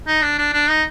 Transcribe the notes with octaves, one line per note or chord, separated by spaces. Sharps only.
D#4
D4
D4
D4
D#4